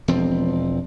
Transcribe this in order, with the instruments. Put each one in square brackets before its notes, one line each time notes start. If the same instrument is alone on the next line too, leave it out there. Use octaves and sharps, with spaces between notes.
[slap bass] E1 F3 C4